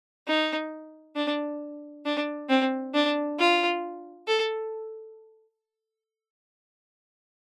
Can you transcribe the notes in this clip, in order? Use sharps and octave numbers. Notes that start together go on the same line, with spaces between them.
D#4
D4
D4
C4
D4
F4
A4